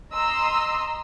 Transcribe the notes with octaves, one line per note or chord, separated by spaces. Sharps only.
D#5 A#5 C6 E6